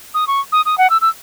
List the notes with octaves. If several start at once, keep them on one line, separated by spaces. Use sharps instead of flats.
D#6
C#6
D#6
D#6
F#5
E6
E6